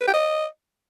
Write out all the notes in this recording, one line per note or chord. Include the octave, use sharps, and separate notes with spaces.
B4
G5
D#5